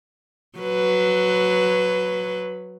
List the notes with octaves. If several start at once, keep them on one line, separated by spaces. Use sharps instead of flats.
F#3 B4